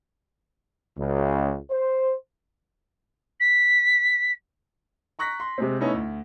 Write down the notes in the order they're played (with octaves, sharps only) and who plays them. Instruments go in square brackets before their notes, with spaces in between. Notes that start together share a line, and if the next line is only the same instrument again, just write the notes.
[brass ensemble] C#2
C5
[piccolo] B6
[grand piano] A#5 C#6 F#6 A#6 B6
C6
C3 G#3 C4
A3 B3 C#4 D#4 E4
D2